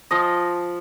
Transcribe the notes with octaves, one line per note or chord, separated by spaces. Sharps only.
F3 D#5